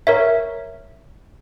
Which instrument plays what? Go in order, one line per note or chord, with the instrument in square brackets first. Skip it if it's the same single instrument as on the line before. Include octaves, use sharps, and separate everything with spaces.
[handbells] A#4 C#5 E5